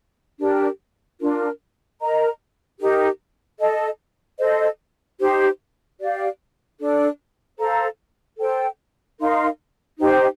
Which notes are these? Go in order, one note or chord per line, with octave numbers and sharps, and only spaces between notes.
D4 G4 A#4
D4 F4 A#4
A#4 D#5 A#5
D#4 G4 A#4
A4 D#5 A5
A4 C5 D#5
D#4 G4 C5
G4 D5 F5
D4 A4 D5
A4 C5 F5 A#5
A4 C5 G5
D#4 A#4 F5 C6
D#4 G4 C5 G5